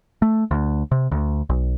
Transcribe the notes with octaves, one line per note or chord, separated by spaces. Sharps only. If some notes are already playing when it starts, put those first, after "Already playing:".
A3
D2
C3
D2
B1